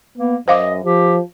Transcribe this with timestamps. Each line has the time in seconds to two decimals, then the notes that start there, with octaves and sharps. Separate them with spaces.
0.18 A#3 B3
0.48 F#2 C5 D#5 F5 D6
0.84 F3 G4